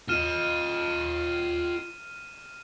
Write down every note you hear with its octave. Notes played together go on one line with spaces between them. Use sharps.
F4 D#5 F6 D#7 E7